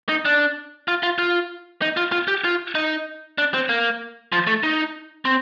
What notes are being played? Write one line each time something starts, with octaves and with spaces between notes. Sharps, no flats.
D#4
D4
F4
F4
F4
D#4
F4
F4
G4
F4
D#4
D4
C4
A#3
F3
A3
D#4
C4